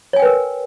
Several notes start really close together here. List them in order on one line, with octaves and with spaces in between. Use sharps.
C#5 G#5 G5 B4 A#4